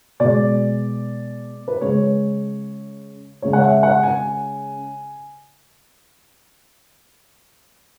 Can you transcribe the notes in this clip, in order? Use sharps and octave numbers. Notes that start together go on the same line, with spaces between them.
B2 G#3 D5
B4
C#3 G#3 C#5
C#3 G#3 C#5
F#5
E5
F#5
G#5